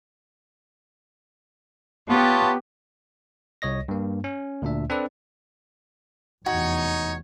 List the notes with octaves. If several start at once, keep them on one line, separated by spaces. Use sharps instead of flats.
B3 F4 G4 C#5 A5
C2 C#5 D#5 A#6
G2 A#3
C#4
D2 A#2 D4 E5
C4 D4 A4 B4 D5
F1 E2 D#4 F#4 C#5